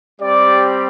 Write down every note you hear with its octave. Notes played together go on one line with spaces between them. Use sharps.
G3 C4 G4 D5